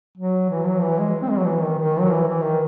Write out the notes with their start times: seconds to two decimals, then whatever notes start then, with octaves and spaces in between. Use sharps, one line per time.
0.18 F#3
0.50 E3
0.66 F#3
0.82 E3
0.99 G#3
1.22 C4
1.30 G#3
1.38 F#3
1.46 E3
1.62 D#3
1.79 D#3
2.00 F#3
2.11 E3
2.27 E3
2.43 D#3